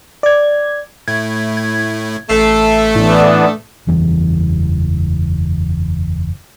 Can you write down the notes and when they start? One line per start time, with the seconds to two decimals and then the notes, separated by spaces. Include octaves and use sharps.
0.23 D5 G#6
1.08 A2 A3 E4 G#6
1.57 G#6
2.30 A1 A3 A4 E5 C7
2.95 A2 E3 B3 D4
3.87 F#1 E2 E3 G3